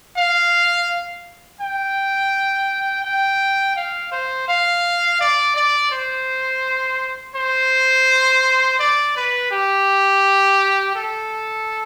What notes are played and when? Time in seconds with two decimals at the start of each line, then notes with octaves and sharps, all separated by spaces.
0.17 F5
1.61 G5
3.05 G5
3.76 F5
4.12 C5
4.48 F5
5.20 D5
5.56 D5
5.92 C5
7.35 C5
8.79 D5
9.16 B4
9.51 G4
10.96 A4